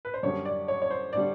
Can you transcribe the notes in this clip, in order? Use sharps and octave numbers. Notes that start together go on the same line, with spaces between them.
B4
C5
F#2 D3 G3 C#5
D5
C#5
C#5
C5
D3 G3 D5